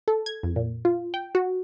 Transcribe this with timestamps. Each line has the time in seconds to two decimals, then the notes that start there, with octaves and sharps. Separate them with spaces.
0.08 A4
0.26 G#6
0.43 F2
0.56 A#2
0.85 F4
1.14 G5
1.35 F#4